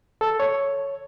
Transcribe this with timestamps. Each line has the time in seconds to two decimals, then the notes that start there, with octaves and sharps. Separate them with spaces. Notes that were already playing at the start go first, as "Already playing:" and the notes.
0.21 A4
0.40 C#5